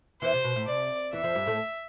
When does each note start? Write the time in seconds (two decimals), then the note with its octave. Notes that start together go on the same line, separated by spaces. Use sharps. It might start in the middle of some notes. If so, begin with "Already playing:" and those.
0.22 E2 E3 C5
0.34 C3
0.45 B2
0.56 A2
0.67 C3 D5
1.13 E2 E3 E5
1.24 F2 F3
1.35 G2 G3
1.46 A2 A3